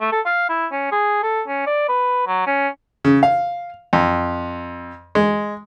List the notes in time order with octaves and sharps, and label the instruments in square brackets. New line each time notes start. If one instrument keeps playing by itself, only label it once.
[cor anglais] A3
A4
F5
E4
C#4
G#4
A4
C#4
D5
B4
F#3
C#4
[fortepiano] C#3
F5
F2
G#3